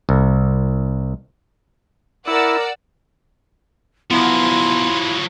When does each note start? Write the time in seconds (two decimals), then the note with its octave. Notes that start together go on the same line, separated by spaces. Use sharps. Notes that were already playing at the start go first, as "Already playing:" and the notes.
0.09 C2
2.28 E4 A#4 D5 F#5 E6
4.11 F3 F#3 B3 E4 C6